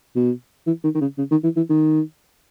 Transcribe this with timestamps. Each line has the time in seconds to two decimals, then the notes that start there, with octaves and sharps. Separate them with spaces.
0.16 B2
0.67 E3
0.84 D#3
0.95 D#3
1.01 C#3
1.18 C#3
1.31 D#3
1.43 E3
1.57 E3
1.70 D#3